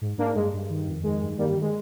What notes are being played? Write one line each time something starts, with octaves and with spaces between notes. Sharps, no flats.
G#2
G#2 A#3 D4
G2 G#3
G2
D#3
F2
D#3 G#3
G2
D#3 G3 A#3
G3
D#3
G#3